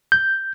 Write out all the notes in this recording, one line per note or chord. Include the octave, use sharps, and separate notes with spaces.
G6